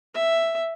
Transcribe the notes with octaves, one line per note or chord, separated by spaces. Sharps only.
E5